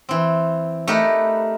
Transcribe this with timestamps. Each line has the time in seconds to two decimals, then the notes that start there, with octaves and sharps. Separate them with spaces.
0.09 E3 C4
0.87 A3 D#4 G4 A#4 B4